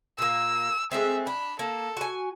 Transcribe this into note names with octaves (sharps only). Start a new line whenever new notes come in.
A#2 A#3 E6
G#3 A3 C4 E5
D4 B5
A#3 A4
F#4 G#5